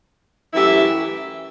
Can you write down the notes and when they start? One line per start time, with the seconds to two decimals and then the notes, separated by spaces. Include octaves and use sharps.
0.53 F#2 E3 A3 E4 G4 E5